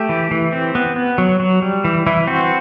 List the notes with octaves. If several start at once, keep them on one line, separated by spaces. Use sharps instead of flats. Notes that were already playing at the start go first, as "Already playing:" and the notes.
Already playing: A3 G4
E3
E3
C4
B3
B3
F#3
F#3
G3
E3
E3 E4
C4 F#4